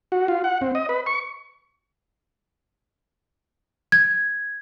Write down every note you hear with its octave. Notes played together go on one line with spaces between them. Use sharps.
F#4
F4
F#5
C4
D#5
B4
C#6
G#6